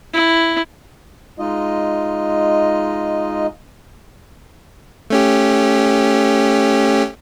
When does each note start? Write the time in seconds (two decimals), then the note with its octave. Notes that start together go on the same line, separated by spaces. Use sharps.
0.13 E4
1.39 G#3 D#4 F4 D#5
5.10 A3 C#4 G4